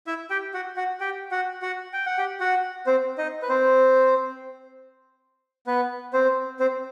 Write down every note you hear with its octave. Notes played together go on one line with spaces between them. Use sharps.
E4 E5
G4 G5
F#4 F#5
F#4 F#5
G4 G5
F#4 F#5
F#4 F#5
G5
F#5
G4 G5
F#4 F#5
C4 C5
D#4 D#5
B4
C4 C5
B3 B4
C4 C5
C4 C5